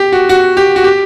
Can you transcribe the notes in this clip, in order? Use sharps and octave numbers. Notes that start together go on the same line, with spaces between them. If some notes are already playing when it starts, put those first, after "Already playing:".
Already playing: G4
F#4
F#4
G4
F#4
G4